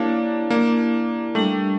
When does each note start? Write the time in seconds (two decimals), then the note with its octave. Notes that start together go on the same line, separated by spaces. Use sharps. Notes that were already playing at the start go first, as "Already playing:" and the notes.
Already playing: A#3 D4 E4 G4 C#5 F5
0.50 A#3 E4 G4 D5
1.35 G3 A3 D4 G4